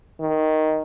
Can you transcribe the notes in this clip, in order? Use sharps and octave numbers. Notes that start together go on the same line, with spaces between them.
D#3